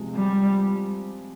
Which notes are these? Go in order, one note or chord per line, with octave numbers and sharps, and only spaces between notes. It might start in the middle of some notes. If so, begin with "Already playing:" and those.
Already playing: C3 F3 G#3
G3